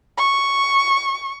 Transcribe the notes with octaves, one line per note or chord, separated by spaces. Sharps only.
C#6